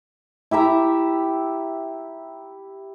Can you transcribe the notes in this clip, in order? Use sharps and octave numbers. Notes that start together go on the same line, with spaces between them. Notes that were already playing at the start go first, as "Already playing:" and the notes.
E4 G4 E5 A#5